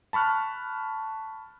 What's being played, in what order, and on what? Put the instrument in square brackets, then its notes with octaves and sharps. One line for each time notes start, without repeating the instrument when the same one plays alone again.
[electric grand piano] A5 B5 C#6 F6 F#6